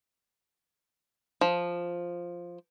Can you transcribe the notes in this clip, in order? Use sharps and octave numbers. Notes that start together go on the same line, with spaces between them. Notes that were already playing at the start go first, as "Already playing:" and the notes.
F3